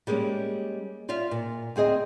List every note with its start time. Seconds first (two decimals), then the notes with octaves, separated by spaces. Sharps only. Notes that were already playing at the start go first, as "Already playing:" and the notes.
0.07 G3 G#3 A#3 C4 C#4
1.09 F4 D5 E5 F5
1.31 A#2
1.76 D2 C4 G#4 D#5